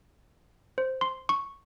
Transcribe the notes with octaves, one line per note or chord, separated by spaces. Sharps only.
C5
C6
C#6